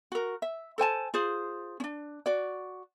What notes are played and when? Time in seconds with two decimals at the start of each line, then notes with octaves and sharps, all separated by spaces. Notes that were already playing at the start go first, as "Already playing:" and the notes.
0.12 F#4 A#4
0.42 E5
0.78 A4 C5 G#5 A5
1.14 F4 G#4 C5
1.80 C#4 D4
2.26 F#4 D5